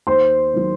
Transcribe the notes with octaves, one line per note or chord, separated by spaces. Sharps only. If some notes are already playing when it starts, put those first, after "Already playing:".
D#2 C5 C6
D#3 F#3